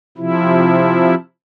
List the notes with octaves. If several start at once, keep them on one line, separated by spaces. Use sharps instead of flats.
C3 F3 E4